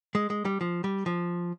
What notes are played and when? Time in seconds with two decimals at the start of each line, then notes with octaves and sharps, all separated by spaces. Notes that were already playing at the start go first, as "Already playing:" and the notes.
0.15 G#3
0.30 G#3
0.45 G3
0.61 F3
0.84 G3
1.06 F3